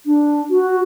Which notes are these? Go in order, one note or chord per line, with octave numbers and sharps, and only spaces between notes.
D4
F#4